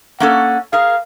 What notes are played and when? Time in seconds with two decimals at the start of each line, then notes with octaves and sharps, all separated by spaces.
0.20 A#3 C#4 A4 F#5
0.73 G#4 A#4 F5